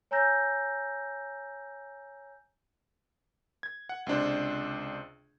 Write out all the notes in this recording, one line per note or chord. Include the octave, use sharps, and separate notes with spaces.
C#5 G#5 A#5 E6 G6 A#6
G#6
F#5
C#2 C3 D4 C5